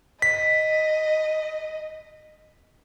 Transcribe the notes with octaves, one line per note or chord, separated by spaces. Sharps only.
D#5 B6